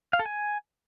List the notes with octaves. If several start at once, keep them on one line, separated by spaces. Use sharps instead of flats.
F5
A4
G#5